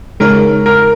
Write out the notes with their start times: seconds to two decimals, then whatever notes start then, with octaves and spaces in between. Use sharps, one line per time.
0.20 C#3 G#3 D#4 G#4 A#4 C#5
0.66 A#4